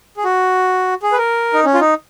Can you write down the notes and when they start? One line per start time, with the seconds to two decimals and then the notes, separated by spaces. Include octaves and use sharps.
0.17 G#4
0.24 F#4
1.03 G#4
1.12 B4
1.18 A#4
1.53 D#4
1.65 C#4
1.74 F4
1.80 D#4